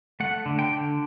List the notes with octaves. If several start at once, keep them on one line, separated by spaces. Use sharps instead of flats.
A3 F#5
D3
G5
D3